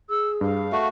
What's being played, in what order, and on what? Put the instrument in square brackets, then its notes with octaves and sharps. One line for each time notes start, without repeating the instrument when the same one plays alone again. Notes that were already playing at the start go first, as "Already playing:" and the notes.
[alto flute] G#4 [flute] E6
[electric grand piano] G2 [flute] F5
[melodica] A3 F#4